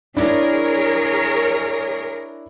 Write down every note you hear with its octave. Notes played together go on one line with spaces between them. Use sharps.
D4 E4 G#4 A#4 C#5